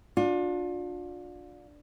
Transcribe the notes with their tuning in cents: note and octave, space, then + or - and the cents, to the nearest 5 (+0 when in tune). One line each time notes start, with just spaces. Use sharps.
D4 +0 F4 +35